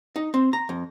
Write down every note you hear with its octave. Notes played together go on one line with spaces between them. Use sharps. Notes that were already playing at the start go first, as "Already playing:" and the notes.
D#4
C4
A#5
F2